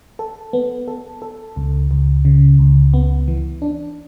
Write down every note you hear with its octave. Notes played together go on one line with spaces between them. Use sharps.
A4
B3
A4
A4
C#2
C#2
C#3
C#2
B3
E3
D4